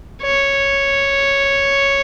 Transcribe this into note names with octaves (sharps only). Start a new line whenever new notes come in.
C#5